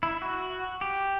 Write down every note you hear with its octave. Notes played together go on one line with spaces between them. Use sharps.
E4
F#4
G4